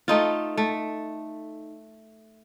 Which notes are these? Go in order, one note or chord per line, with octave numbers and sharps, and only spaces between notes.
A3 D#4 F4
A3